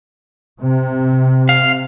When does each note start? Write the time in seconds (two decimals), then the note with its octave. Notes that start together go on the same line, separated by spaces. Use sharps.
0.62 C3
1.49 F5